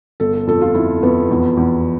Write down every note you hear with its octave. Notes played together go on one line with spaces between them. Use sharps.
G1 A4
A4
F2 A4
F4
F2 E4
F2 B3
E2
E2